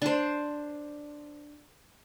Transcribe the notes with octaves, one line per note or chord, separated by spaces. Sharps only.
D4 C5